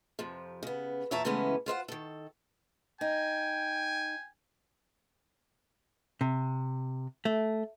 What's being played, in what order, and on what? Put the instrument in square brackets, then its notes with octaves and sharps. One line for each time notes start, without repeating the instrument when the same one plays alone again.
[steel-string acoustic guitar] F2 C3 F3
C#3 B3
E2 A#2 C#5 E5 A5 A#5
C#3 E3 G#3 A3 B3 C#4
F4 C5 E5 F#5
D#3 A4
[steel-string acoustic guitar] D#4 [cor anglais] G5 [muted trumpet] G#5
[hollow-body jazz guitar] C3
A3